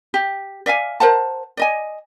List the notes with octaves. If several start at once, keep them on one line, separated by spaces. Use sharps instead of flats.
G4
D5 E5 F5 G#5
A#4 C5 F#5 A5
D5 D#5 G#5